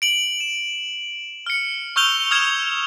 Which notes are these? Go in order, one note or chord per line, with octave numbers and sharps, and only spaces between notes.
D7 F#7
E7
F6 C#7
C#6 E6 F6 G6 F7 G7
D#6 F6 G#6 E7